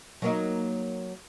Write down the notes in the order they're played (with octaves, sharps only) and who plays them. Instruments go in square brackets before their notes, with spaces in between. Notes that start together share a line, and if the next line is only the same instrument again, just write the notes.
[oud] F#3 A#3 D#4